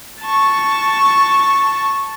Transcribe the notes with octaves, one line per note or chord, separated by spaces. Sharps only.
A5 C#6